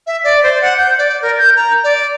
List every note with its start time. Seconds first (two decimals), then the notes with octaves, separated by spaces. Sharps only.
0.07 E5
0.24 D5
0.43 C5
0.62 F#5
0.77 G6
0.99 D5
1.22 A#4
1.38 G6
1.56 A#5
1.84 D5